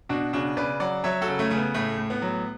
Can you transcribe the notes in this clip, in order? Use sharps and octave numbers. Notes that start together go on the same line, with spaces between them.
B2 D4 F#4
C#3 D4 F#4
C#3 B4 D5
F#3 D5 F#5
F#3 C#5 E5
F#4 A4
C#3
A3 C#4
C#3 A3
B3
A2 A3
A2
B3
F#3